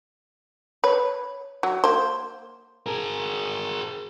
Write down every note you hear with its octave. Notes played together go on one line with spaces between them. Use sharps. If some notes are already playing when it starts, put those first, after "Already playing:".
B4 C#5
F#3
A#3 C5
G#4 A#4